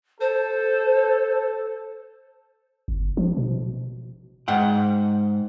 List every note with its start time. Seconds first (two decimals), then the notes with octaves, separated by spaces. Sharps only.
0.21 A4 C5
2.88 G1
3.17 F3
3.37 B2
4.48 G#2 F#5 G5